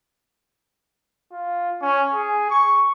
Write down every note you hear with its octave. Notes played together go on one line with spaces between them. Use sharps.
F4
C#4
G#4
C#6